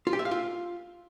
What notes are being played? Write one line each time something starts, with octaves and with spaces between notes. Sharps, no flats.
F4
G4
E5
F5
F4